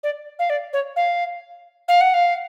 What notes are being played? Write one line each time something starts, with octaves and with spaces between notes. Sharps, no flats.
D5
F5
D5
C#5
F5
F5
F#5
F5